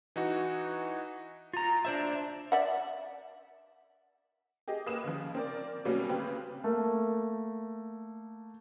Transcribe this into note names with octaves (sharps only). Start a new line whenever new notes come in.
E3 D#4 F#4
F4 A#5
D4 C5 E5
D5 E5 F#5
G4 G#4 D#5
A#3 B4 D#6 E7
C#3 F3
C4 A#4 D5
B2 F#3 G3 A3 A#3 C#4
C#3 C4 G4 B4
A3 A#3